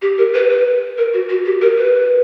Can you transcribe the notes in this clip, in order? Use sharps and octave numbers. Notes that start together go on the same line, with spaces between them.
G4
A#4
B4
B4
A#4
F#4
F#4
G4
A#4
B4